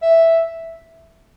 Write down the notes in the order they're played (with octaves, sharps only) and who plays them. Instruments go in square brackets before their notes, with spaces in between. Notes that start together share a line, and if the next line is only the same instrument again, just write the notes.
[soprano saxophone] E5